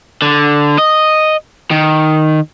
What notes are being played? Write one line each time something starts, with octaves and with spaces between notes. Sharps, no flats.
D3
D#5
D#3